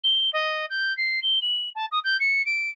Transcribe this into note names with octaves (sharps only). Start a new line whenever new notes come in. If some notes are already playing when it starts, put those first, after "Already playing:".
G7
D#5
G6
C7
G7
F#7
A5
D#6
G6
C#7
D7